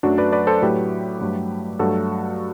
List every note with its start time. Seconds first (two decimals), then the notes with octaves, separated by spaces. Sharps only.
0.03 F#2 F#3 A3 D4 F#4
0.18 B4 D5
0.32 B4 D5
0.47 A4 C5
0.62 A2 F#3 A3 G4 B4
1.21 G2 F#3 A3
1.79 G2 F#3 A3 F#4 A4